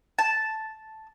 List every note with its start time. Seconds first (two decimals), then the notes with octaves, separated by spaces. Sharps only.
0.19 A5